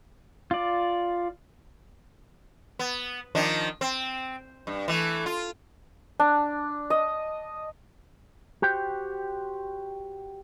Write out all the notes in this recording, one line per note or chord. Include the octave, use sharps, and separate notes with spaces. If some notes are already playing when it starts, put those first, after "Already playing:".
F4 D5
B3
D#3 F3 D4
C4
G2
E3 A3
F4
D4
D#5
F#4 G4 C5 G5